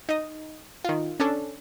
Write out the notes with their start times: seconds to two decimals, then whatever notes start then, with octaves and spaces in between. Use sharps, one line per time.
0.09 D#4 D#5
0.85 D#3 F4
1.20 C#4 D4 A4